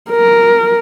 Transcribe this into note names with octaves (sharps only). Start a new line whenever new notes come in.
A#4